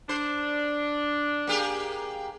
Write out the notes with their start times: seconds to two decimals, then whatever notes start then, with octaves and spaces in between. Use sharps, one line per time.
0.09 D4 C5
1.47 A#3 G4 G#4